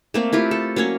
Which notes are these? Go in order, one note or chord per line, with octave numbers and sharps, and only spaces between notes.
A3 A#3 C4
A3 E4 F4 G4
A4
F#3 A#3 C#4 C#5